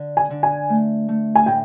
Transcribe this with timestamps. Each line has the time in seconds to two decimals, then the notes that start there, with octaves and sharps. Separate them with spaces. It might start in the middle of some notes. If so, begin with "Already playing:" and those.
Already playing: D3
0.17 G#5
0.30 D3
0.43 G#5
0.69 A3
1.09 A3
1.36 G#5
1.46 A2 G5